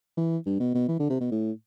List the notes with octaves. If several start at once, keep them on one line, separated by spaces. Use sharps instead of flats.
E3
G2
B2
B2
E3
D3
C3
B2
A2